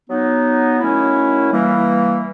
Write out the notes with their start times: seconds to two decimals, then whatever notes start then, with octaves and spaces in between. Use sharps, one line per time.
0.09 F#3 B3 D#4
0.80 D#3 F#3 A3 C#4 E4
1.51 E3 G3 A#3